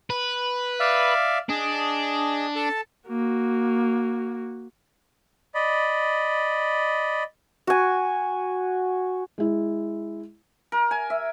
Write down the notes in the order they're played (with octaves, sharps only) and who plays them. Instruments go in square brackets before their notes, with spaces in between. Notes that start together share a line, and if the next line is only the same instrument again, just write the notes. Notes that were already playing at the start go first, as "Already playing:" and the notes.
[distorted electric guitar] B4
[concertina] D5 E5 F5
[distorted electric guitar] D4 [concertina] G#4 D#5
[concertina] A4 A5
[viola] A#3 F#4
[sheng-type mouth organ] D5 D#5 B5
[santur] F#4 G#5
[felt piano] G#3 E4
[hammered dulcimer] A#4
G#5
E5